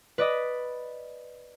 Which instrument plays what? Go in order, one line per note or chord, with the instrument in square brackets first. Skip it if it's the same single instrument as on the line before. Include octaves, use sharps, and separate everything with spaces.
[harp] B4 D5 D#5